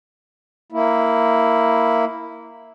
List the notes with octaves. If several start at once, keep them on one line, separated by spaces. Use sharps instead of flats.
A#3 E4